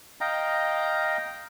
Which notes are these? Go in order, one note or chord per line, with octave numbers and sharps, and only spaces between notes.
D#5 F5 G5 A#5